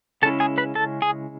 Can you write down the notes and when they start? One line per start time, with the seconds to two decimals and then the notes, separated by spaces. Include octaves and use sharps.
0.22 C#3 G#3 C#4 E4 A4 A5
0.40 G#4 G#5
0.58 B4 B5
0.75 A4 A5
1.02 G#4 G#5